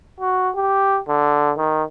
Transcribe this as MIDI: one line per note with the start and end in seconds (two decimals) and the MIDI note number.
0.21 0.50 66
0.55 1.00 67
1.08 1.52 50
1.57 1.83 51